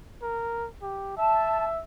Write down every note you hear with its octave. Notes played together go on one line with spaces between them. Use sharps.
A#4
G4
E5 A5